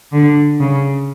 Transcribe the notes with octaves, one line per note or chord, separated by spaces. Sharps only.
D3
C#3